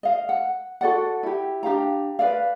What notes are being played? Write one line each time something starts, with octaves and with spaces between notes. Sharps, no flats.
D#5 F5
F#5
F#4 A4 D5 F#5
E4 G4
D4 G4 F5 A#5
B4 D5 F5